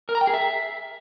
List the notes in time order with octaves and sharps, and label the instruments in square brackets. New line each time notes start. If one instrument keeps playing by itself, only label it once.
[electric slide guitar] A#4
A#5
G5
G#4
E5